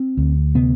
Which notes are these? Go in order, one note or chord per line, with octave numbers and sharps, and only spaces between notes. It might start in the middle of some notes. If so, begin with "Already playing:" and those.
Already playing: C4
D2
C3 B3